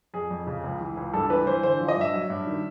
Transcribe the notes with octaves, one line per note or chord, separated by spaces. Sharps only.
F2 G#4
F2
C#3
C#2
E3
C#2
G2 A4
E3 B4
E3 C5
D3 C5
F3
D#5
G2 E5
F#3
G2
D#3